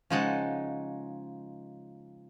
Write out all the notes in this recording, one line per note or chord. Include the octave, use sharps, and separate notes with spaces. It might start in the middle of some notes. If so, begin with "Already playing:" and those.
C#3 F3 G#3 D#4 F#5 A5